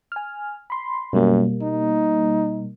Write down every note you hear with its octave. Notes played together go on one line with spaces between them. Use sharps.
G#5 F6
B5 C6
F#2 B2 G3 A#3
D#4